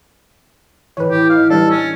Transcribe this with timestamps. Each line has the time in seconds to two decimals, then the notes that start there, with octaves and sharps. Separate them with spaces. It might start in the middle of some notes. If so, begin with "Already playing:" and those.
0.97 A2 E3 B4 C#5
1.11 G4
1.29 D#4 F5
1.50 E3 G3 D4 A4
1.71 C#4